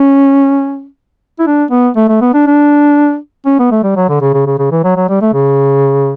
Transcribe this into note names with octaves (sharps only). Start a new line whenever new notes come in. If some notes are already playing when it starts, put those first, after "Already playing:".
Already playing: C#4
E4
D4
B3
A3
A3
B3
D4
D4
C#4
B3
A3
G3
F#3
D3
C#3
C#3
C#3
C#3
E3
F#3
F#3
G3
A3
C#3